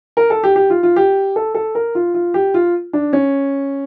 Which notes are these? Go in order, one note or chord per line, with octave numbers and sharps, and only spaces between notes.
A#4
A4
G4
G4
F4
F4
G4
A4
A4
A#4
F4
F4
G4
F4
D4
C#4